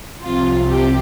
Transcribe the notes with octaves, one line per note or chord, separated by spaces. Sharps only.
C2 C3 F3 F4
G4